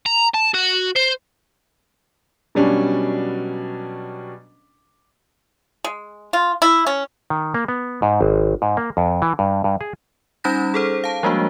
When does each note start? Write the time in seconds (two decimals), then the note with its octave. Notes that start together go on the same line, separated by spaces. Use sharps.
0.06 A#5
0.34 A5
0.54 F#4
0.96 C5
2.55 B2 F#3 G3 C#4 D4
5.84 G#3
6.33 F4
6.62 E4
6.86 C#4
7.30 D#3
7.54 A#3
7.68 B3
8.02 G#2
8.21 G#1
8.62 G#2
8.77 A#3
8.97 F2
9.22 E3
9.39 G2
9.64 G2
9.81 G#4
10.44 G3 C#4 D#4 B5 G6 A#6
10.74 G#4 A4 C5
11.04 F5 A5
11.23 F3 G3 G#3 A#3 D4 F#4